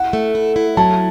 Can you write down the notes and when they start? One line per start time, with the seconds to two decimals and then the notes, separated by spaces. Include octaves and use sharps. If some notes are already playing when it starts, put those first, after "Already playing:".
Already playing: E4 F#5
0.13 A3
0.35 E4
0.56 E4
0.77 F#3 A5